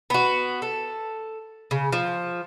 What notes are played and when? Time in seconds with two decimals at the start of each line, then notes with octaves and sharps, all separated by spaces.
0.10 B3 F#4
0.62 A4
1.71 C#3
1.92 F3